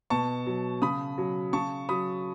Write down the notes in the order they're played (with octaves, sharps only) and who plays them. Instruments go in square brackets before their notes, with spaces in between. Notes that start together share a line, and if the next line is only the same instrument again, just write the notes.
[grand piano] B2 A5 C#6
F#3
C#3 B5 D#6
F#3
C#3 A5 C#6
F#3 B5 D#6